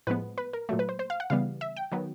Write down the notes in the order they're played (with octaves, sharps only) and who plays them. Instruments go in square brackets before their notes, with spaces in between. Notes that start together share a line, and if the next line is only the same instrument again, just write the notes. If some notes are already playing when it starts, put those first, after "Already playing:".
[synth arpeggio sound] A2 F3 G#3 B3 B4
B4
A#4
A#2 F#3 A3
B4
C5
C5
F5
F#5
C#3 E3 G3 B3 F5
E5
G5
D#3 F#3 B3